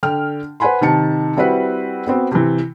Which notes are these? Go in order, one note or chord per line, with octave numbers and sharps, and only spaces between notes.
D3 G5 F6
B4 C5 F#5 G#5 B5 C6
C3 D#3 A5 C#7
G3 C4 E4 F#4 B4 F#5
B3 C4 F#4
C3 E3